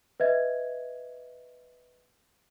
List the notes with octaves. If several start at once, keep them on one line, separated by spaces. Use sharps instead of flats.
B4 D#5 E5 G#6